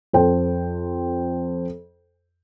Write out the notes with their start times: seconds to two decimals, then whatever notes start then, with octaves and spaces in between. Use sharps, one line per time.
0.13 F2 A4 C5 G5